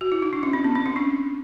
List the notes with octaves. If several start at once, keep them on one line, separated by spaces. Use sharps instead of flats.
F#4
E4
D#4
D4
C#4
C4
B3
C4
C#4
D4